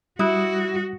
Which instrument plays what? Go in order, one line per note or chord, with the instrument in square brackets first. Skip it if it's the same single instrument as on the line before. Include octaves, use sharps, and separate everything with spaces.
[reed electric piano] G3 D#6 F#6 [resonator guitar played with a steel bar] E4 [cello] F#4